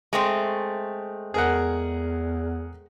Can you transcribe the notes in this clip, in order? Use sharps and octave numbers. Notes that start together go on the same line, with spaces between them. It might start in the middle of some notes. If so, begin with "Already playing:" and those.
G#3 A3 C4
E2 G#4 A#4 F#5